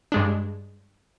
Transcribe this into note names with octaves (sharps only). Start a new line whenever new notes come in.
G2 G#3 D4